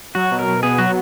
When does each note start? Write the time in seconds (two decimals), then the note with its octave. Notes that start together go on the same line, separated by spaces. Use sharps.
0.15 F#3 F#4
0.31 B2
0.39 A#4
0.47 B2
0.63 B3 G#4
0.78 F#3 F#4